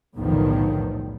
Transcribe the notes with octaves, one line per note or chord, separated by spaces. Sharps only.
B1 E2 A2 D3 D#3 F3